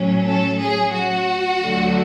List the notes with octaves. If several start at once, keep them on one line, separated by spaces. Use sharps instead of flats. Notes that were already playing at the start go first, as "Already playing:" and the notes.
Already playing: A2 F#3 C#4
A4
G#4
F#4
D2 D3 F#3 A3